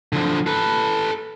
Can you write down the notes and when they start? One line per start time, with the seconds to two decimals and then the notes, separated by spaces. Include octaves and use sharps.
0.13 D3 F3
0.47 A4 B4